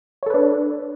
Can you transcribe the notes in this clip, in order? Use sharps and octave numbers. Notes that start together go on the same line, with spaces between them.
D4 A4 B4 C#5